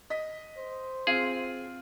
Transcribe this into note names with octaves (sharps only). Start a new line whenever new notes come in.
D#5 B6
C5
C4 F4 G#4